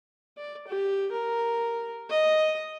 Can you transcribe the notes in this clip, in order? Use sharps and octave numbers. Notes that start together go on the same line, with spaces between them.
D5
G4
A#4
D#5